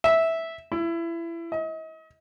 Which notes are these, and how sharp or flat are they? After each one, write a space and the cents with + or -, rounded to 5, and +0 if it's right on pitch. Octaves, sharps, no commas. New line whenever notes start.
E5 -10
E4 +25
D#5 +40